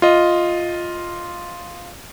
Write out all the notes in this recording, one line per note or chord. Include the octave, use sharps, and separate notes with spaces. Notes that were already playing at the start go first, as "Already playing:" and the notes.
F4 D#5